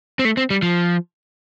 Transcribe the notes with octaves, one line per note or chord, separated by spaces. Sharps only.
C4
A3
C4
G3
F3